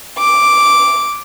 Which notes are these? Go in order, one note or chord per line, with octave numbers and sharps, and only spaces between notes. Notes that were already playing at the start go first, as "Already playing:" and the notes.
D6